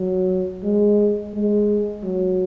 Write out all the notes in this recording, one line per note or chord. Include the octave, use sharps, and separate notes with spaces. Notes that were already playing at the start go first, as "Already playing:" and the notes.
Already playing: F#3
G#3
G#3
F#3